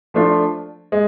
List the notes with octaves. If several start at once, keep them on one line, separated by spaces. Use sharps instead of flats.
F3 A3 D4 F4
G#3